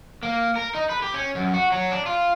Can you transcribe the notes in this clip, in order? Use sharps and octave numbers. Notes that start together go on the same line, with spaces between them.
A#3
A#4
D#4
B4
G4
C#4
F#2
F#4
F#3
D4
F4